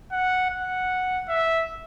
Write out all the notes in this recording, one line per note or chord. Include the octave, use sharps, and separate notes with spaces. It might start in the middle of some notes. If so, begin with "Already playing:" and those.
F#5
F#5
E5